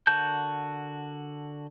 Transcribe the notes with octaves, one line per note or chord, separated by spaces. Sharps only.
D3 F#4 A#4 A5 G6